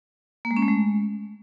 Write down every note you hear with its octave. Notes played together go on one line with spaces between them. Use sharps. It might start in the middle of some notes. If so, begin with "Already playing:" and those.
A#3
G#3
C#4
A3
G#3